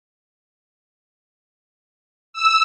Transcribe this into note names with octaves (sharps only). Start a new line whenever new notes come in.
E6